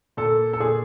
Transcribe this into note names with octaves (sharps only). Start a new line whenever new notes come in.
A#2 A4
A4
A#2 G#4